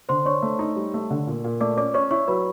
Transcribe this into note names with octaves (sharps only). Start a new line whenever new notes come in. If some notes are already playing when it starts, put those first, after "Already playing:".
D3 C5 C6
D4 C#5 C#6
A3
D#4
G3
A3
D3
A#2
A#2
A3 D5 D6
C#4 D5 D6
C#4 C#5 C#6
E4 C#5 C#6
F#3 B4 B5